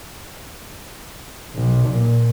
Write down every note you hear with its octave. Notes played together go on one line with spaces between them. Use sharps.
B1
A#2